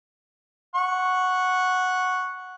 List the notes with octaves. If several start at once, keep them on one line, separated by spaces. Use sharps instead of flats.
F#5 C#6